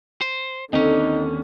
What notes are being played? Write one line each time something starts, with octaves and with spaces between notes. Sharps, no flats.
C5
D#2 D3 C4 C#4 D#4